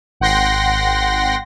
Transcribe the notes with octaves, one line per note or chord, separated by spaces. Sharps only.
G#1 F#5 G5 C6 A#6